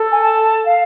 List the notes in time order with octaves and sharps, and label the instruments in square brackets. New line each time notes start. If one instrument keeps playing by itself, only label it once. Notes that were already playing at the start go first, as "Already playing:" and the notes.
Already playing: [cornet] A4
[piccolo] G#5
A5
F5